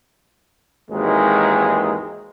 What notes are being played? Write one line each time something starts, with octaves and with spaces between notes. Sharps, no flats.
G#1 D#2 E3 G#3